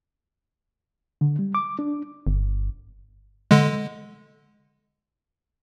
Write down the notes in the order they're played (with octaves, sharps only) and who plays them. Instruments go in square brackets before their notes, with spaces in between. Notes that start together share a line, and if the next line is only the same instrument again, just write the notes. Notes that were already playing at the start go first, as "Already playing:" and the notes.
[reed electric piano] D3
G3
D6
D4
[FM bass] G1
[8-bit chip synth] D3 G#3